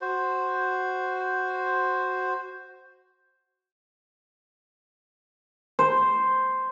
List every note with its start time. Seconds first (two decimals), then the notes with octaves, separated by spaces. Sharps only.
0.01 F#4 C5
5.79 C5